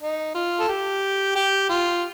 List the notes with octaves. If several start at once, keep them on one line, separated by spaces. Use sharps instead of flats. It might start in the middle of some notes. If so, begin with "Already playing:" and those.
D#4
F4
A4
G4
G4
F4